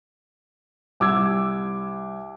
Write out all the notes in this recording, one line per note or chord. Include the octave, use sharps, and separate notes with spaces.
C2 D6 E6 G#6